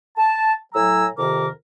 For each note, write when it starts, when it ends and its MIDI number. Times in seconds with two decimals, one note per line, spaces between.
0.17 0.52 81
0.74 1.06 45
0.74 1.06 54
0.74 1.06 80
0.74 1.06 82
0.74 1.06 88
1.17 1.47 41
1.17 1.47 48
1.17 1.47 51
1.17 1.47 70
1.17 1.47 86